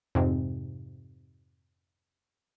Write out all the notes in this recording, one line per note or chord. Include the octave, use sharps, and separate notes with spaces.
F2 G#2 C3